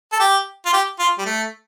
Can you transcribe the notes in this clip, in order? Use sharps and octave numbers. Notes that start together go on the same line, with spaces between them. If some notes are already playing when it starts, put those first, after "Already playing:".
A4
G4
F4
G4
F4
G3
A3